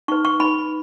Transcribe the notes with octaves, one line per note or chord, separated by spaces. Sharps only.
D#4 B4 C#6
C#6
D#4 B4 B5